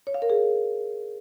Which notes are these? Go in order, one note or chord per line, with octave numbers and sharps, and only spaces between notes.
C#5
F5
A#4
G#4